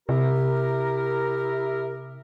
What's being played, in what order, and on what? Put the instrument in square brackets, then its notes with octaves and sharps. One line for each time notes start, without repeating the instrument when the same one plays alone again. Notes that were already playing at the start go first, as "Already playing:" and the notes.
[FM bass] C3 [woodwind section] E4 G4 A#4